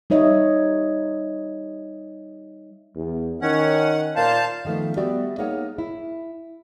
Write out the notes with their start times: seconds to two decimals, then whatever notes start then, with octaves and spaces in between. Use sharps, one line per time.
0.10 G3 D#4 C#5 D#5 E5
2.96 E2
3.42 D#3 C#4 F#5
4.16 A#2 C5 F5 A5
4.65 D#3 F3 A3 B3
4.97 G3 B3 F#4 D5 E5
5.38 A#3 D#4 G#4 C#5 F#5
5.78 E4